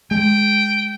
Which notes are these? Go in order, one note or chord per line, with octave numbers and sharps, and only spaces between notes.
G#3 G5